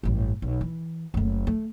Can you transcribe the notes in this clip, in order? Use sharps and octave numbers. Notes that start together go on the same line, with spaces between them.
A1 G2
B1
E3
F#1 A3
A3